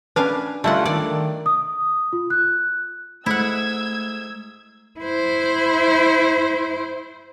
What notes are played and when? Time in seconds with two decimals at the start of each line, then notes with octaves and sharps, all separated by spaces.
0.16 C#4 D4 B4 F5 G#5
0.64 C#2 D3 G3 A3 E4 F4 F#5
0.85 D#3 D4 A4 D5
1.05 D#3
1.46 D#6
2.13 F4
2.30 F#6
3.26 G#2 A3 E4 F#5 E6 G#6
4.99 E4 C5